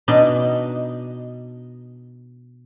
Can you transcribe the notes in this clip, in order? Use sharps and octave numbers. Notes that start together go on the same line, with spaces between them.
B2 D4 D#4 D#5